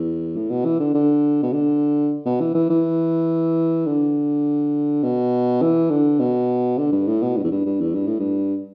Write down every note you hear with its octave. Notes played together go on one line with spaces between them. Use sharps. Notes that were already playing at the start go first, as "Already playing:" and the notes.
Already playing: E2
A2
B2
E3
D3
D3
B2
D3
B2
E3
E3
E3
D3
B2
E3
D3
B2
D3
G2
A2
B2
G2
E2
G2
G2
E2
G2
A2
G2